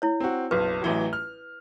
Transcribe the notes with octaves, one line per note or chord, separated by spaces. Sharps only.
E4 C#5
C4 F#4
F#1 B1 B4
A1 E3 F#3
F6